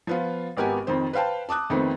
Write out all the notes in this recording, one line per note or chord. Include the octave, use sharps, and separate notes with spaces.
F3 B3 F4
G#1 B3 G4 A#4 F#5 G#5
F2 D#3 C5
B4 C5 F5 G5 A5
A5 D6 D#6 F#6
F2 D#3 A3 B3 C4